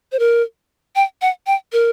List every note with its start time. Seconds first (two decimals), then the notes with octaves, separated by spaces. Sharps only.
0.12 C5
0.19 A#4
0.96 G5
1.22 F#5
1.47 G5
1.73 A#4